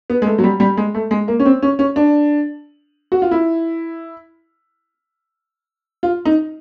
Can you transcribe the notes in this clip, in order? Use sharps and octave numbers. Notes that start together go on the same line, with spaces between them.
B3
G#3
A3
F#3
G3
G3
G#3
A3
G#3
A#3
C#4
C4
C#4
C#4
D4
F#4
F4
E4
F4
D#4